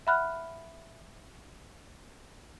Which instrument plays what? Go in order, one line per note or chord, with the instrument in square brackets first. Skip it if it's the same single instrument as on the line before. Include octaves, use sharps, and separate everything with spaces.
[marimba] E5 F#5 B5 F6 F#6